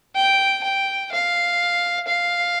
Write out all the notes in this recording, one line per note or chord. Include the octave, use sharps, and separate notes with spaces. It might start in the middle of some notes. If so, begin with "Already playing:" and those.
G5
G5
F5
F5